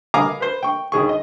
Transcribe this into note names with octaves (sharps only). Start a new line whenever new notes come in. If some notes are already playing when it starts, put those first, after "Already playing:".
F5 G#5 A#5 B5 D6 D#6
B4 C5
G5 C#6
D#2 D#3 G#4 C#6
D#5